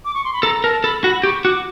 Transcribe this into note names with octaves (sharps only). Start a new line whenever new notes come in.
D6
C#6
C6
B5
A4 A#5
A#4 A5
A4 B5
F#4 B5
G4 C#6
F#4 D6